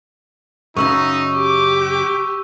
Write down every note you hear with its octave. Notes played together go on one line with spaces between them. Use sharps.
F#2 C#3 C#4 D#4 C#6 E6
G4 D6